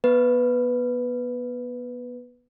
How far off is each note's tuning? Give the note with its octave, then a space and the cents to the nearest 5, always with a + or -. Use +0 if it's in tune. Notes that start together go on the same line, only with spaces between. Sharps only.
B3 -25 B4 +0